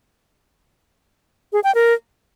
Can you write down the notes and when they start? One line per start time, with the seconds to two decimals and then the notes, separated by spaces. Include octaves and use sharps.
1.53 G#4
1.64 G5
1.75 A#4